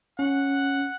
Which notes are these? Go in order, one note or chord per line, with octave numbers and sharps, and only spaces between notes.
C#4 F#5